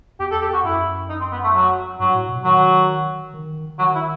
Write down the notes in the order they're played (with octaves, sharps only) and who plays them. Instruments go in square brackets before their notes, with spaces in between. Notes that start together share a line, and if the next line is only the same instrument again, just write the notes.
[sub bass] E2 [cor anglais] G4
[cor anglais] A4
G4
F#4
[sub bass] F#2 [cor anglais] E4
[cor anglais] D#4
C4
B3
A3
F#3
[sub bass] G2 [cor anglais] F#3
[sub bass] A2
B2
[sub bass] D#3 [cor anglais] F#3
[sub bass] D#3
[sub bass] D#3 [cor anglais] F#3
[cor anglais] E4